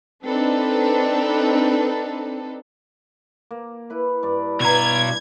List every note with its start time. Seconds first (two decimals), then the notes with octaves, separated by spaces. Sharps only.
0.24 C4 D4 D#4 A4 B4
3.51 A#3
3.90 E4 B4 B5
4.23 G2 D5
4.60 G2 B2 A#5 G#6